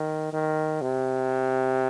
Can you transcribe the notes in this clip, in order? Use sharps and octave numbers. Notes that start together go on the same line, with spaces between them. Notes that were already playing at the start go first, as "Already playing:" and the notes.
Already playing: D#3
D#3
C3